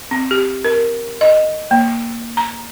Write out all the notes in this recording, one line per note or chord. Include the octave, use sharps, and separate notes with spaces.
C4
G4
A#4
D#5
A#3
A#5